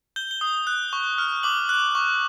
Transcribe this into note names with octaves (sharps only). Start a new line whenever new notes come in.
G6 G7
G7
D#6
F#6
C#6
F6
D6 F#7
F#6
C#6